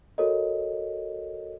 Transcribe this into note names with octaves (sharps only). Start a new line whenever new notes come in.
F#4 A4 A#4 C#5 D#5